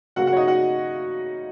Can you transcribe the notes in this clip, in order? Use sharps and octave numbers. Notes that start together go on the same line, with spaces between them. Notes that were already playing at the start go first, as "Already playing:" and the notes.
C#3 F#3 A#3 F#4 F#5
F#4 F#5
C#5
D#4 D#5
F#4 F#5